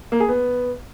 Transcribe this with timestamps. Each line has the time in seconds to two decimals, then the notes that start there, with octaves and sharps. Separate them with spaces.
0.12 A#3
0.20 G#4
0.29 B3